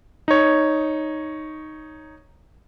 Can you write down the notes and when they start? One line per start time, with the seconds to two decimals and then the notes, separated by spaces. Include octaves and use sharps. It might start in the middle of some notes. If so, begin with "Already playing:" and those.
0.28 D#4 C#5